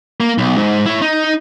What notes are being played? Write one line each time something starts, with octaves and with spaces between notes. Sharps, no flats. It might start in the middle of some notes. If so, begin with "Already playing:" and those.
A#3
B1
G#2
E4 C#5
D#4